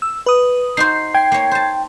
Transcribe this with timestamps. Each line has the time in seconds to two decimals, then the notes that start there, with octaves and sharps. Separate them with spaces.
0.02 E6
0.26 B4 D#6
0.77 D#4 F#4 C5 C7
1.15 G5 G#6 C7
1.32 A#3 C#5
1.51 C5 A5